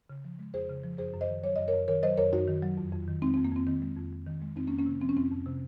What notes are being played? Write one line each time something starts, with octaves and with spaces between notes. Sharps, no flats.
C#3
F3
G#3
F2 G#4 C5
C#3
F3
F#2 G#4 C5
F#2
C5 D#5
D#3
F#3 C#5
F#2 D#5
F#2 A#4 C#5
D#3 A#4 C#5
F#3 C5 D#5
F#2 A#4 C#5
F#2 D#4 F#4
D#3
F#3
F2
F2
D#3
G#3 C4 D#4
F2 C4
A#3
F2 C4
D#3 C4
G#3
F2
F2
D#3
G#3
F2 C4 D#4
A#3 C#4
F2
A#3 C#4
C3
F3 C4
C#4
F2 C4
F2
C3